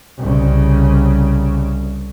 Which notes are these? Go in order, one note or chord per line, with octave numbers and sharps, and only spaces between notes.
C2 C#3